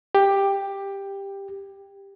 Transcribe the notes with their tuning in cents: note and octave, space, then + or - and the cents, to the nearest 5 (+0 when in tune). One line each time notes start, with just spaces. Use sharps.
G4 +10